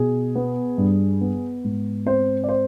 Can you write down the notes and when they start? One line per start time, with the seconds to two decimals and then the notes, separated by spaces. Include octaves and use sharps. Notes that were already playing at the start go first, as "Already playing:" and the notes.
Already playing: B2 G#4
0.35 B3
0.78 G2
1.21 B3
1.64 G#2
2.06 C4 C5
2.44 D5
2.49 C5